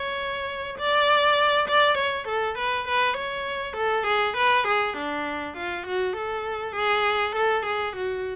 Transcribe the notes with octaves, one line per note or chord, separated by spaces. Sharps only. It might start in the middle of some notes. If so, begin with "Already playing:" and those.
Already playing: C#5
D5
D5
C#5
A4
B4
B4
C#5
A4
G#4
B4
G#4
D4
F4
F#4
A4
G#4
A4
G#4
F#4